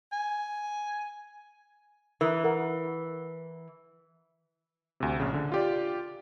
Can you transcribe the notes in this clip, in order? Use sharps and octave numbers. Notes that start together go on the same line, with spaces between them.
G#5
E3 A#4 D#6
A#4 F#5
D2 C3
A#1 C#3
D3
F4 G4 D5